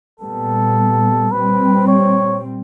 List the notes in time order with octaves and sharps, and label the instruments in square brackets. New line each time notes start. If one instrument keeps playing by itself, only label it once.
[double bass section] A#2 G3 B3 [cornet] A4
[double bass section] A#2 G3 C4 [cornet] B4
[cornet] C#5